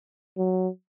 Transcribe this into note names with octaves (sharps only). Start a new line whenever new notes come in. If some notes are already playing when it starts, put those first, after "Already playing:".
F#3